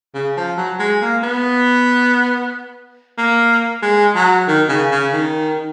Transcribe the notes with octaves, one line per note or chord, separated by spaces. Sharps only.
C#3
F3
F#3
G#3
A#3
B3
A#3
G#3
F#3
D#3
C#3
C#3
D#3